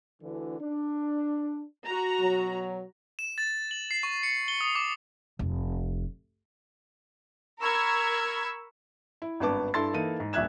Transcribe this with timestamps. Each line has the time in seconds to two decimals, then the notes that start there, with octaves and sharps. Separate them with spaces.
0.22 D2 D3 E3
0.60 D4
1.86 F#4 A#5
2.18 B2 F#3
3.19 E7
3.38 A6
3.71 F#7
3.91 C7
4.03 C#6
4.23 C#7
4.48 G7
4.61 D#6
4.75 D6
5.39 F1
7.61 A#4 B5 C#6 E6 G#6
9.22 E4
9.40 G#1 G2 B3 B4 A5 D6
9.74 G2 E4 A4 C6 A6
9.94 E3 A#3 D#4 A4 D#7
10.20 G#2
10.33 D#1 A#1 E5 F#6 G#6 E7